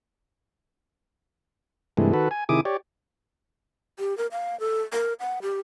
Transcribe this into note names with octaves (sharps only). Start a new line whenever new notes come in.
G2 C3 E3 G#3 A3
D#3 F#4 A4 B4
G#5
C3 D#3 E4 G#4 D6 D#6
G4 C#5 D5
G4
A#4
F5
A4
A#4
F#5
G4